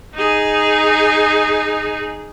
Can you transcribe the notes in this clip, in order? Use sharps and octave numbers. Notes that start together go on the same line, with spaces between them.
D#4 G#4